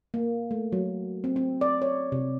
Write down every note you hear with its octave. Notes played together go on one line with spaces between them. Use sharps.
A#3
A3
F#3
C4
C4
D5
C#5
C3